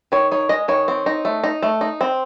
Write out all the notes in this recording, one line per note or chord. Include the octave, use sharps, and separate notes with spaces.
D#3 C#5
D#4 C#5
G#3 D#5
D#3 C#5
C4
D#4
A3
D#4
A3
D#4
C4